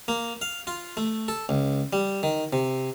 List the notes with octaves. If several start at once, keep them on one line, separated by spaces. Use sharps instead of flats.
A#3
F5
F4
A3
A4
C#2
G3
D#3
C3